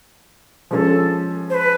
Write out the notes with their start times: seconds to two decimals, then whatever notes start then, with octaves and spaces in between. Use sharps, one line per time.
0.71 F3 G#3 C#4 A4 B4
1.50 C5
1.55 B4